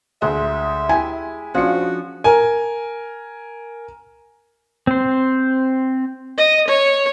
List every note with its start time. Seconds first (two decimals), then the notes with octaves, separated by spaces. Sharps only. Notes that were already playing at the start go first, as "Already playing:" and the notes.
0.22 D2 G#3 E5
0.89 E4 G4 G#5
1.55 F3 C#4 D4 F#4 C#7
2.24 A#4 G#5
4.87 C4 C5
6.37 D#5
6.68 C#5